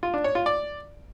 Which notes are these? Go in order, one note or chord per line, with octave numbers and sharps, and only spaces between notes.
F4
D4
C#5
F4
D5